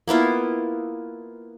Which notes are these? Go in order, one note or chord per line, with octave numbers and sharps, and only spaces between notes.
A#3 B3 E4 F4